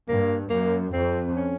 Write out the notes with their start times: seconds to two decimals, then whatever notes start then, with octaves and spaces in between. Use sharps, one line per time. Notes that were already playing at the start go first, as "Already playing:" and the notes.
0.08 G2 A#3
0.50 F#2 A#3
0.93 F2 C4
1.36 C#4